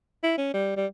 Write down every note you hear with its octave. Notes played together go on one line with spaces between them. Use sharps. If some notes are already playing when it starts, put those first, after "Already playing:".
E4
C#4
G3
G3